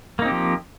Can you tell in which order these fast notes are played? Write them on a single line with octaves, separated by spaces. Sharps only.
A#3 D#4 C4 G4 F3